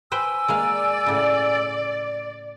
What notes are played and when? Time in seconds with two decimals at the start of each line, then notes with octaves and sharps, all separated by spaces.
0.12 B4 C5 G5 G#5 E6
0.48 G#3 A#3 D5 F5
1.06 A2 C#3